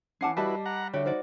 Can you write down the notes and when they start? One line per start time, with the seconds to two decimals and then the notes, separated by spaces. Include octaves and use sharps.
0.21 E3 C#4 F#5 A5 D6 C7
0.37 G3 E4 F#4 B4 D#5 A5
0.66 F#5 A#5
0.94 D3 F#4 G4 C#5 E5 G5
1.06 D#4 F#4 C5 D5